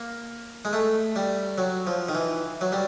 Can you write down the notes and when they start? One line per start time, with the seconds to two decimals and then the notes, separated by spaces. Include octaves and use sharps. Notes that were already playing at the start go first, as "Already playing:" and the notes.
Already playing: A#3
0.65 G#3
0.73 A3
1.16 G3
1.58 F#3
1.87 F3
2.09 D#3
2.15 E3
2.61 F#3
2.72 G3